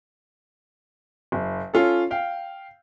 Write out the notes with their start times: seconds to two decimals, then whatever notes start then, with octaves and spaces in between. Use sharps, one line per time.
1.32 F#1
1.74 C#4 F4 A4
2.11 F5 G5